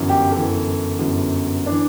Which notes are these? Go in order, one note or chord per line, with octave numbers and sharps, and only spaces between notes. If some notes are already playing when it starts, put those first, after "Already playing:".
Already playing: G1 F#2 E3
G4
G1 F#2 E3 A4
G1 F#2 E3
E3 D4